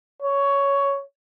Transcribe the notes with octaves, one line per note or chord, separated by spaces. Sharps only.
C#5